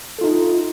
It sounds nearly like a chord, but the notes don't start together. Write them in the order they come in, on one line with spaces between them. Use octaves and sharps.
A4 F4 D#4